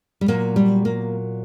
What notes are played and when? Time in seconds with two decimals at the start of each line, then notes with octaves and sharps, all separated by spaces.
0.21 G3
0.28 A#2 F#3 A#3
0.56 G3
0.85 A#3